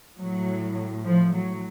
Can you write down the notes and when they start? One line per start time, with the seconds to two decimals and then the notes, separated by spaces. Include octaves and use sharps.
0.19 A2 F#3
1.05 F3
1.35 F#3